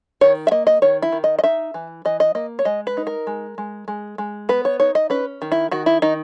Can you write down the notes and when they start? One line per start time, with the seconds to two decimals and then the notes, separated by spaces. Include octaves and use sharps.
0.21 D#3 C#5
0.47 E5
0.51 A#3 D#5
0.67 D#5
0.82 D#3 C#5
1.02 E4
1.12 D#3
1.24 D#5
1.39 D#5
1.44 D#4 E5
1.74 E3
2.05 E3 D#5
2.20 D#5
2.35 A#3 D#5
2.59 C#5
2.65 G#3 D#5
2.87 B4
2.97 D#4
3.07 A#4
3.27 G#3
3.58 G#3
3.88 G#3
4.18 G#3
4.49 B3 B4
4.65 C#5
4.80 D#4 C#5
4.95 D#5
5.10 C#4 B4
5.42 D#3
5.52 E4
5.71 D#3 F#4
5.86 E4
6.02 D#3 D#4